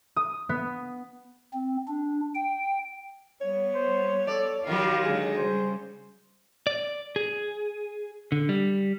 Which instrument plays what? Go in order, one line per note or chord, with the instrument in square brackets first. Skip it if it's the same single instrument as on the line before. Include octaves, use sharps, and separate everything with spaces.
[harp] D#6
B3
[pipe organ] C4
D4
G5
[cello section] G3 B3 [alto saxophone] C#5
[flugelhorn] C5
[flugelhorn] A4 [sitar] D5
[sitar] D#3 F#3 [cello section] F4 G4 A#4 [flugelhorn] F5
[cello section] D3 G#3 D#4 [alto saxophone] G#4
[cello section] C#3 G3 [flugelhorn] C5
[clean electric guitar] D5
G#4
D3
G3